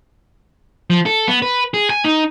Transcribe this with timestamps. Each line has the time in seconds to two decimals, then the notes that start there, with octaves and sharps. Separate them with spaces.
0.90 F3
1.06 A4
1.28 B3
1.42 B4
1.74 G#4
1.90 G#5
2.04 D#4